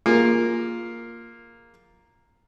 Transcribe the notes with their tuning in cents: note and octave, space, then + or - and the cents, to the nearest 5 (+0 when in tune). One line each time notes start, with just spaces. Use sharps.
A#3 +0 F4 +0 G#4 +0